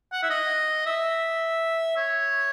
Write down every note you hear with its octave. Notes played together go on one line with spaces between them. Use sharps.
F#5
E5
D#5
E5
C#5